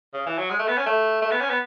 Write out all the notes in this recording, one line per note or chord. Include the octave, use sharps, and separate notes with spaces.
C#3
E3
F#3
G#3
A3
B3
C#4
A3
A3
B3
C#4
B3